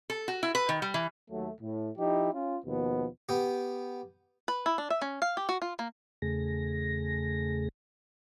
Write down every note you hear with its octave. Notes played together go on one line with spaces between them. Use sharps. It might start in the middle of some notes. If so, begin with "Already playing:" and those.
A4
F#4
E4
B4
D#3
G3
E3
D#2 F#3 A3
A2
F3 D#4 E4 G4
C#4 F4
D#2 B2 F3 B3
B3 G4
B4
E4
D4
E5
C#4
F5
G4
F#4
F4
A#3
E2 C#3 A3 G#4 A#6